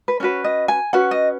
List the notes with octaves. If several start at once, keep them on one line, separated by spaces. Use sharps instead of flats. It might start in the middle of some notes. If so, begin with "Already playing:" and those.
B4
C#4 F#4 B4 C#5
D#5
G#5
C#4 F#4 B4 F#5
D#5